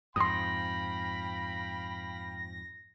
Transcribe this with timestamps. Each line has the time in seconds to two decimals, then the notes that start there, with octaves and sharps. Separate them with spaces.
0.16 F2 G#2 F5 G5 B5 C6 D#6 A#6